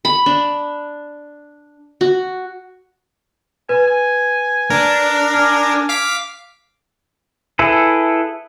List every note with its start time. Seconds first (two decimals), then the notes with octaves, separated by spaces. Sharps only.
0.05 B5
0.26 D4
2.01 F#4
3.69 B4 G#5
3.87 G#5
4.70 D4 A#4
5.34 G#5 F6
5.89 F5 D6 B6
7.59 E4 G#4 A4 B4